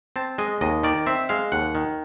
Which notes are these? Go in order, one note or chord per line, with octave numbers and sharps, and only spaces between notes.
C4 A5
G#3 D#5
D#2 D#5
D#3 D5
C4 E5
G#3 F5
D#2 F#5
D#3